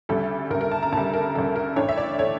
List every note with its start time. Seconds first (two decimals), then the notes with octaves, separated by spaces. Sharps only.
0.09 D2 C#3 G3 A4
0.51 D2 C#3 G3 A#4
0.61 A#4
0.72 A5
0.83 A#5
0.93 D2 C#3 G3 A5
1.14 A#4
1.35 D2 C#3 G3 A4
1.56 A#4
1.76 A1 G2 D3 A3 D4 C#5
1.89 E5
1.98 D5
2.18 D3 A3 D4 C#5